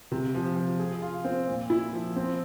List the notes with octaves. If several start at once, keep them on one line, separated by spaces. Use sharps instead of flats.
C3
F3
F3
G#4
F4
C4
A#2
E4
F3
C4